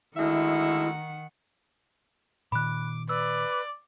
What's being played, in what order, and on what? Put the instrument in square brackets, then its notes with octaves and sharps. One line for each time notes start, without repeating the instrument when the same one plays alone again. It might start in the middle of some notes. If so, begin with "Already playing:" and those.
[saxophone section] D2 G#3 E5 [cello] D#3 F#5 [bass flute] E4
[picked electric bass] A#2 D#3 [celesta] B5 F#6 [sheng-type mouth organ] D6
[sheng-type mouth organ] B4 [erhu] D5 [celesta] E6